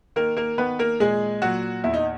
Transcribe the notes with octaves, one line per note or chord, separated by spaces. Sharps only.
D#3 A#3 A#4
A#3 A#4
D#3 B3 B4
A#3 A#4
A#2 G#3 G#4
A#2 F#3 F#4
E2 E4
D#4